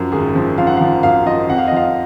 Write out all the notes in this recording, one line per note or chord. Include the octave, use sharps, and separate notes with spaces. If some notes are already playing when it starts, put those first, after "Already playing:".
Already playing: F#2 F3 A#4
G#1 G#4
F3
F3 F5
F#5
F3 F5
F#2 F5
F3 D#5
F2 F#5
F5
D#5
F3 F5